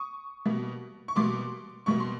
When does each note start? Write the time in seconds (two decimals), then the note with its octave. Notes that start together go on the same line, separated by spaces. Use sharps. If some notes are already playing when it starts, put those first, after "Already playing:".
Already playing: C#6 D#6
0.46 B2 G3 A#3
1.08 C#6
1.16 B2 G3 A#3 C6 D6
1.86 B2 G3 A#3 C#6
2.00 C6